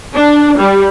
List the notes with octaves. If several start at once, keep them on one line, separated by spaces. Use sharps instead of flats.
D4
G3